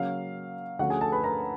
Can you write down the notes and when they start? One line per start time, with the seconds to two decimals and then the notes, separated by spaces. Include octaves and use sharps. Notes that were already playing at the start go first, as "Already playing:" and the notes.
Already playing: C#3 F#3 A#3 C#4 F5
0.79 D2 D3 F3 A3 C#4 F#4 F#5
0.90 G#4 G#5
1.01 A4 A5
1.12 B4 B5
1.24 A#4 A#5